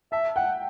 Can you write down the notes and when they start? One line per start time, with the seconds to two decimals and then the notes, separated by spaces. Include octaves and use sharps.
0.12 E5 A5
0.36 F#5 G5